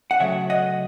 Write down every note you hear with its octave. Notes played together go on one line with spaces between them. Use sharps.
F#5
C#3 F#3 A3 C#5 E5
D#5 F#5